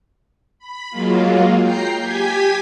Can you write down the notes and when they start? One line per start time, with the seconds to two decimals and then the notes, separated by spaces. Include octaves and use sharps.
0.59 B5
0.90 F#3 G#3 A#3 F4
1.60 G5 A#5 G6 C7
2.01 G4 G#5 G#6 B6